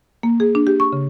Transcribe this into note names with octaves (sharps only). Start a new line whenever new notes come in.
A#3
G#4
D4
G4
C#6
C#3